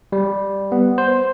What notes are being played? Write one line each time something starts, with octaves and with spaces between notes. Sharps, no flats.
G3
B3
C5